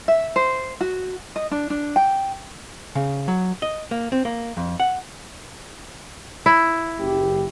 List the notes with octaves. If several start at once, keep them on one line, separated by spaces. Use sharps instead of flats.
E5
C5
F#4
D#5
D4
D4
G5
C#3
F#3
D#5
A#3
C4
A#3
F2
F#5
E4
F#1 G4